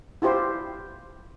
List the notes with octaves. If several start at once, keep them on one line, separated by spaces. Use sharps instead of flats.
E4 F4 G4 C5